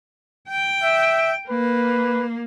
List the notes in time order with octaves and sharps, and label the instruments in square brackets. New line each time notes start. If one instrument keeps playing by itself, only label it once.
[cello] G5
[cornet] E5
[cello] A#3 [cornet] B4